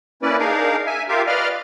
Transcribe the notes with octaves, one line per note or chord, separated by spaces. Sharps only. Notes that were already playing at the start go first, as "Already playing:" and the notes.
A#3 C#4 E4 B4 D5
D4 D#4 G#4 A#4 F5
E5 G#5
F4 G4 A#4 E5 F5
B4 D5 D#5 F5 F6